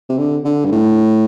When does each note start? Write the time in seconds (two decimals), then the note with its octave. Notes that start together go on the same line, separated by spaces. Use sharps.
0.09 C3
0.18 D3
0.45 D3
0.65 G2
0.72 A2